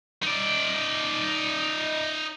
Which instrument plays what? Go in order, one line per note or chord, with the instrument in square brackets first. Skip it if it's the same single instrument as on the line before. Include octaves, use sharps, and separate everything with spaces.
[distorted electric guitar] D#4 D5